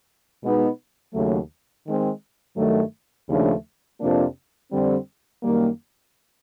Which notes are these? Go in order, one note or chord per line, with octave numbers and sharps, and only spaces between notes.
B2 G#3 B3 D#4
D#2 C#3 F#3 A3
D#3 G#3 C4
G2 D#3 F#3 A3
D#2 C#3 F3 A3 D4
F2 C3 F3 A#3 D4
F2 D3 G3 C4
F#2 D#3 G3 A#3